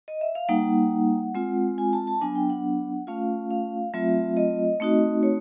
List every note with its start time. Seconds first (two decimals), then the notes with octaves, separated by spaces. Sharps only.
0.08 D#5
0.21 E5
0.35 F5
0.48 G3 A#3 D#4 F#5
1.35 G#3 C4 F4
1.78 G#5
1.93 A5
2.07 A5
2.21 F#3 B3 D4 G#5
2.35 G5
2.50 F#5
3.07 A3 C#4 F4 F5
3.51 F5
3.94 F#3 A3 C4 F4 E5
4.37 D#5
4.80 A3 C4 D#4 F#4
5.23 C#5